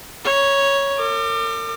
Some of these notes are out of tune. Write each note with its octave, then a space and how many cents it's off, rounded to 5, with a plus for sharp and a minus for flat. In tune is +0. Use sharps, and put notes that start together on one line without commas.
C#5 +0 B5 -45
A#4 -40 D6 +30